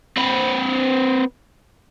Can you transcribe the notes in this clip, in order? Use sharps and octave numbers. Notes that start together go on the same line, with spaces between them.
C4 B4